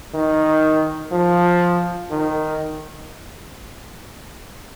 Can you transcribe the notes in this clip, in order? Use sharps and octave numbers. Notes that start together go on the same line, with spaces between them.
D#3
F3
D#3